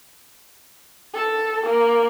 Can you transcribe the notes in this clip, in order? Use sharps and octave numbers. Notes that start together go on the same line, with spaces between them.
A4
A#3